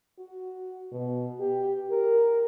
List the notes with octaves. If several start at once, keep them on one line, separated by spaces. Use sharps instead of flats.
F#4
B2
G4
A#4